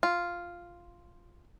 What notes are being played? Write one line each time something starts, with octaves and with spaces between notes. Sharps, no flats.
F4